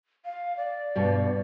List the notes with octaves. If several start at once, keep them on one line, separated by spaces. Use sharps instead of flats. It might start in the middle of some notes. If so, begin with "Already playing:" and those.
F5
D5
G2 B2